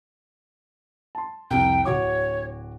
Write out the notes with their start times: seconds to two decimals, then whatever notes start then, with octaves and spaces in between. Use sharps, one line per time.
1.15 A5 C6
1.51 C2 F2 G5
1.85 D1 F#4 C#5 D6